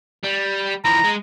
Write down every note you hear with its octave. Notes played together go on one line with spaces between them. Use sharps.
G3
E3 F3 A#5
G#3